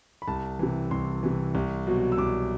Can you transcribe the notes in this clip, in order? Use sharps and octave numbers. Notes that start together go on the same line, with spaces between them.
B5
C2 A5
C3 E3
C2 C6
C3 E3
C2
B2 F#3
E6
C2 D6